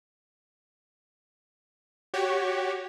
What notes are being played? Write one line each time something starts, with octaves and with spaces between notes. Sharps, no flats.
F#4 G4 C#5